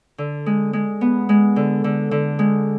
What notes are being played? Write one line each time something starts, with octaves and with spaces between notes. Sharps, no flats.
D3
G#3
G#3
B3
G#3
D3
D3
D3
G#3